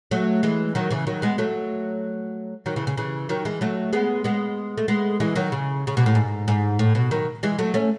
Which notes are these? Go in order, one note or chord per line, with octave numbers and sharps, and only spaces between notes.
F#3 A3
E3 G#3
D#3 F#3
C#3 E3
D#3 F#3
G#3 B3
F#3 A3
D#3 F#3
C#3 E3
C#3
C#3 E3
D#3 F#3
E3 G#3
F#3 A3
G#3 B3
G#3 B3
A3
G#3 B3
E3 G#3
D#3 F#3
C#3
C#3
B2
A2
G#2
G#2
A2
B2
D#3 F#3
E3 G#3
F#3 A3
A3 C#4